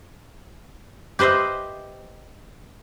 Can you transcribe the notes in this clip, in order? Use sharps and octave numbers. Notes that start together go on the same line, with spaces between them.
G4 B4 C5 D#5 E5